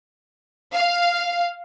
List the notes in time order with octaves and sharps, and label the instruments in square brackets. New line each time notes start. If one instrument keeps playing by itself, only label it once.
[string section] F5